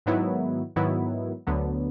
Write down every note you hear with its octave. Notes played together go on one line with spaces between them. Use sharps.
G#2 D#3 F#3 B3 E4
G#2 D#3 F#3 B3 E4
D2 D3 F#3 B3